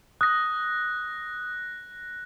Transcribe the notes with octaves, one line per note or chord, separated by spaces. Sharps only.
D#6 F#6 A#6